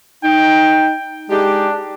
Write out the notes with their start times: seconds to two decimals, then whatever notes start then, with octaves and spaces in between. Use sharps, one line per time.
0.24 D#4 G5
1.30 G#3 D4 D#4 G4